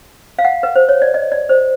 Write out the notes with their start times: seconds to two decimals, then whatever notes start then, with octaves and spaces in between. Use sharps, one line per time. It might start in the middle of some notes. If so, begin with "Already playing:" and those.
0.39 F5
0.45 F#5
0.63 B4
0.76 C5
0.89 C#5
1.02 D5
1.14 D#5
1.32 D5
1.49 C5